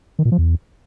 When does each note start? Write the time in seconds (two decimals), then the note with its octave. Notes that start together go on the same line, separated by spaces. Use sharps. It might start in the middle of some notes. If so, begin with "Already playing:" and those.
0.19 D#3
0.25 A#2
0.32 F3
0.38 E2